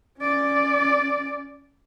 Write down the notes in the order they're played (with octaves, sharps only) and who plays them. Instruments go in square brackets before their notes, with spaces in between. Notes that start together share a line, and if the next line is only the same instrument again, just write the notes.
[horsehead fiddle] C#4 D5